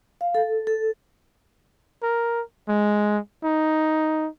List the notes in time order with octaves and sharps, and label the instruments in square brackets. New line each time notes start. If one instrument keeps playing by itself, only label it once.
[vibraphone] F5
A4
A4
[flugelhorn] A#4
G#3
D#4